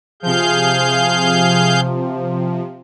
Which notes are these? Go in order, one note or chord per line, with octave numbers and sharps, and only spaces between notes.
C3 F3 G#4 F5 G6